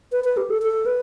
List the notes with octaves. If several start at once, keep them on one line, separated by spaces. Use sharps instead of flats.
B4
B4
G4
A4
A4
B4